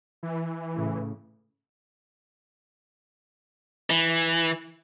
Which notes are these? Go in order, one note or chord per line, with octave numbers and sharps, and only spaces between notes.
E3
A2 C#3
E3